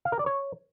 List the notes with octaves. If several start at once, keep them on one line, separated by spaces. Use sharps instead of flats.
F5
A#4
D5
C#5